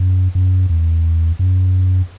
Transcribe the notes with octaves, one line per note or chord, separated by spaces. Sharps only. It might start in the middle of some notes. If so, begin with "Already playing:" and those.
Already playing: F#2
F#2
E2
F#2